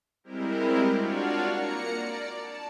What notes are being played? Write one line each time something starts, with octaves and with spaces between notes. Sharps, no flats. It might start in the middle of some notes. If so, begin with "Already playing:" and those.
G3 G#3 C4 E4 G4 A#4
D4 F4 F#4 C#5 D5 F5
A#3 A#5 C#7
D5
A5